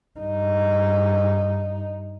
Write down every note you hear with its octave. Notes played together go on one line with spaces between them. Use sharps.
G2 D#4